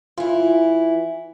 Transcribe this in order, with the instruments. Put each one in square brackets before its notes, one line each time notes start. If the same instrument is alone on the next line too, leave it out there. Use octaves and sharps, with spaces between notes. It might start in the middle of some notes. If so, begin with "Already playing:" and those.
[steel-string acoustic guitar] E3 E4 [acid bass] F4